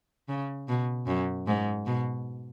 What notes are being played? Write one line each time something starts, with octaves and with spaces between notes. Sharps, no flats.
C#3
B2
F#2
G#2
B2